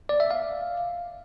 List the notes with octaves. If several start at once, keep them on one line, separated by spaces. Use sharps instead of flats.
D5
E5
F5